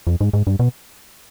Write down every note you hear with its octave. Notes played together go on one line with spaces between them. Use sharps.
F2
G#2
G#2
G2
B2